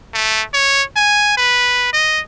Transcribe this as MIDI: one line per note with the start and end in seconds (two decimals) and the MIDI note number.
0.14 0.43 57
0.54 0.83 73
0.97 1.37 80
1.38 1.89 71
1.93 2.20 75